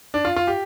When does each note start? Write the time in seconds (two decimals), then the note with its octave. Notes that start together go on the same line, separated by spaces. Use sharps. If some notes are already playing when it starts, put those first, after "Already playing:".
0.14 D4
0.25 F4
0.36 F4
0.47 G4